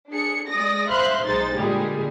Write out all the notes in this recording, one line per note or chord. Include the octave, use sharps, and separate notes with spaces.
D4 G#4 C#7
G#3 D5 D#6 A#6
C5 E5 F5 B5 C6 F#6
B1 G#3 D#4 C5 A6
A#2 D3 G3 G#3 G#4